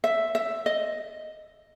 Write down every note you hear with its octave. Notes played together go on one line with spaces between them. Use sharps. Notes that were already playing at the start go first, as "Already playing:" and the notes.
E5
E5
D#5